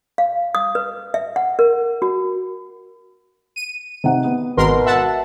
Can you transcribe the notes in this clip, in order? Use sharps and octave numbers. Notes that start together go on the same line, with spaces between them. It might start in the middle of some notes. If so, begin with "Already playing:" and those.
F5
D#6
B4
E5
F#5
A#4
F#4
D#7
C3 D#4 F#5
B3
G#1 B2 A#4 C6
E5 F#5 A5